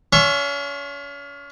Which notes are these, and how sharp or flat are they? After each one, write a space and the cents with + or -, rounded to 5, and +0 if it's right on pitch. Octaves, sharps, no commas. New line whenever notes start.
C#4 +35 E5 +40 C#6 -35